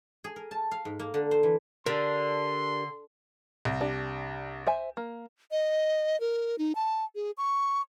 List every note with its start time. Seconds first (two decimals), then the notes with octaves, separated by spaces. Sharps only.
0.24 G#4
0.36 A#4
0.51 A5
0.71 F5
0.85 G#2
0.99 A#3
1.14 D3
1.31 C5
1.43 E3
1.86 D3 D4 G4 A#4 C6
3.65 C2
3.81 D4 G4
4.67 C5 E5 G#5
4.97 A#3
5.51 D#5
6.20 A#4
6.58 D#4
6.75 A5
7.15 G#4
7.37 C#6